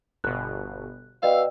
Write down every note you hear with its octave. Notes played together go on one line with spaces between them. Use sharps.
G1 B2 F#6
B2 D5 D#5 F5 G5 E6